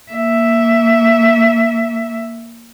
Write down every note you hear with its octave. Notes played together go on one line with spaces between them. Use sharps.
A#3 E5